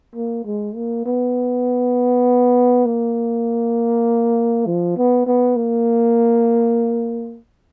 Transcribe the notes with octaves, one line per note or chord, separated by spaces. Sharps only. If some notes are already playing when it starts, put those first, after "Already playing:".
A#3
G#3
A#3
B3
A#3
F3
B3
B3
A#3